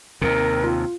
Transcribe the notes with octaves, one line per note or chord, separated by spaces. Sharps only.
D#2 C3 A#4
F4